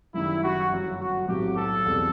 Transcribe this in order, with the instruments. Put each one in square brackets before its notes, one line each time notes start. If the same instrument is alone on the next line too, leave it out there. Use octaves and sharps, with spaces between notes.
[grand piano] F#1 F#2 D#3 G3 [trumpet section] E4
[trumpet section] F#4
[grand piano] G1 F#2 F#3
[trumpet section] F#4
[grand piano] B1 A2 F#3 C4 F#4 [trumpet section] G4
[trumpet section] A4
[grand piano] E1 E2 B2 G3 C4